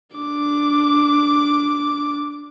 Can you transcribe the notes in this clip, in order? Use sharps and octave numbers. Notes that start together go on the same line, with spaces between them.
D4 D6